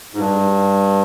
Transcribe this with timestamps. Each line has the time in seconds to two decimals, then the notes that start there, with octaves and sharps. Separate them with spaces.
0.14 G#2
0.19 G2